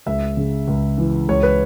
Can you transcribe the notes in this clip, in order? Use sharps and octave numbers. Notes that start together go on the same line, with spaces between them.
C#2 E5
C#3
C#2
E3
C#2 C#5
B4